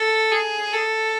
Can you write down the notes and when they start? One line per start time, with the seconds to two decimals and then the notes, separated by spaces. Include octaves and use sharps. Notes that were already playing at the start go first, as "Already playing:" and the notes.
Already playing: A4
0.32 G#4
0.73 A4